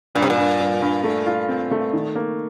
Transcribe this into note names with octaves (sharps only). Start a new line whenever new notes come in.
G2 A#2
C3
A#2
G2
G2
G2
A3
F4
C4
A3
D#3
A#3